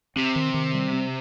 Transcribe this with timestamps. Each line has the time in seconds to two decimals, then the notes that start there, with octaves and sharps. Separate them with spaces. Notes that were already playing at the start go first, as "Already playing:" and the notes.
0.16 C3 C4
0.36 D#3
0.54 D#3
0.74 G3
0.93 C4